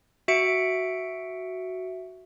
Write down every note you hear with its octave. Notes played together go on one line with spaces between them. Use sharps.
F#4 E5 C#7 D7